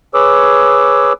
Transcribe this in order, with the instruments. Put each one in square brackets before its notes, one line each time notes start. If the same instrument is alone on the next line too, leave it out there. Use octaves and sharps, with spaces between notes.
[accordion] G#4 B4 C#5 D6 E6